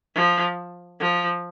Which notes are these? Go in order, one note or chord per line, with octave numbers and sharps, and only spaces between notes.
F3
F3